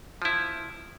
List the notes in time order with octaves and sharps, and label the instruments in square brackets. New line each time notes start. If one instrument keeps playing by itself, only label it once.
[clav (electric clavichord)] F3 E4